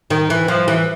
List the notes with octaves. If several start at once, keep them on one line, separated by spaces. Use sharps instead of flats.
D#3
E3
F3
E3